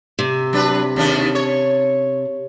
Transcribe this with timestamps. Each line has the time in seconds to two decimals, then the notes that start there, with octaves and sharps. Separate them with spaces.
0.19 C3
0.53 F#3 D4 B4
0.96 D#2 C#3 D4
1.35 C#5